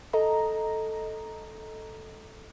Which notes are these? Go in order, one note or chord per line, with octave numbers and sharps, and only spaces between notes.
A4 D#5 A#5